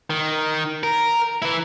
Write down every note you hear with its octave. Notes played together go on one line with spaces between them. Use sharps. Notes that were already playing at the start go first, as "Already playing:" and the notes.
D#3
A#4
E3 E4